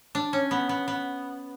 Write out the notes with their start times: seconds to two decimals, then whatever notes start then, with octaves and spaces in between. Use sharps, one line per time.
0.15 D4
0.33 C#4
0.51 B3
0.69 B3
0.88 B3